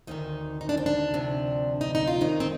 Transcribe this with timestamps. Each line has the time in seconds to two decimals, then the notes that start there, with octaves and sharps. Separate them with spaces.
0.07 D2 C3 D#3 D#4
0.61 D#4
0.69 D4
0.77 C4
0.86 D4
1.14 D2 C3 F3
1.81 D#4
1.95 D#4
2.07 F4
2.21 F2 D#3 D#4
2.40 C4